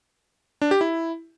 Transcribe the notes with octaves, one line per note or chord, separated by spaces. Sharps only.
D4
G4
E4